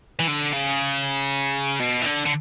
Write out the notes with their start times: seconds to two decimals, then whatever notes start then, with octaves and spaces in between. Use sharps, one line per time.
0.20 E3
0.28 D3
0.54 C#3
1.80 B2
2.01 E3
2.06 D3
2.26 D3